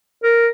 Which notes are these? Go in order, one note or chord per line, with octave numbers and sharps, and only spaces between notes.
A#4